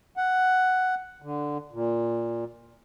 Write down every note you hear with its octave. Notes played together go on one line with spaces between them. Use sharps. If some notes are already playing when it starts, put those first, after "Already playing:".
F#5
D3
A#2